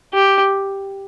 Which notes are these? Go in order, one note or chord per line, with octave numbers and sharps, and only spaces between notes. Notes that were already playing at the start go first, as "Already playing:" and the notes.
G4